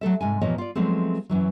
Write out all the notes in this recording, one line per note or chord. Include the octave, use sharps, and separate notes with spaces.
F#3 A3 A4 E5
G#2 C3 G#5
E2 A#2 F3 A#3 C#5 D#5
F4 D5
F3 F#3 G#3 A3 B3 C4
F#2 E3 F#3